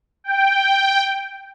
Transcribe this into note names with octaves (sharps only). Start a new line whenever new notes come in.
G5